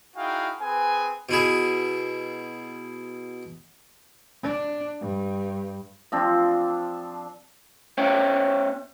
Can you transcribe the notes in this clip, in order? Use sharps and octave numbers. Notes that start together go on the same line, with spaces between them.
D#4 E4 F#4 G#4 F5 G5
C4 G#4 B4 G#5
B2 E4 G#4
D4
G2
F3 C4 D4
B3 C#4 C5 C#5 E5 G5